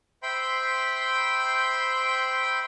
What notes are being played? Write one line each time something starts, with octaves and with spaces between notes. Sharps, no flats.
C5 E5 G5 B5 C6 G6